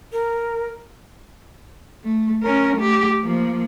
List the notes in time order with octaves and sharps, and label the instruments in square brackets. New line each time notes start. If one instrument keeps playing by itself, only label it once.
[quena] A#4
[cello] A3
C#4 A#4
A3 G4
F3 A#3